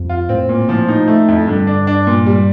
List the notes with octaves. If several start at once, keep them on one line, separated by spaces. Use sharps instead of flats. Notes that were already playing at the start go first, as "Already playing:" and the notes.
Already playing: F2
F4
A2 C4
A#2
A2 F3
D#4
A3
F2
G2 D3
D4
D4
A#2
G3